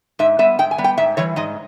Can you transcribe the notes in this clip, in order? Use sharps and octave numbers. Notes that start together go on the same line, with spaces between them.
G#2 E5
G3 B3 E5
G#2 G5
G#5
G3 B3
G5
G#2 E5
E3 G3 C#5
G#2 D#5